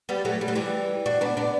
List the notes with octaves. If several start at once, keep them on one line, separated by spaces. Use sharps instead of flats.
G3 B3
F#3 A3
G3
F#3
E3 G3
D4 F#4
B3 D4
B3 D4